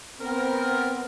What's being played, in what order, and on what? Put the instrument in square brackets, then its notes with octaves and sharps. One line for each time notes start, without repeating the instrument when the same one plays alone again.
[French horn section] B3 C4 [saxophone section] A#4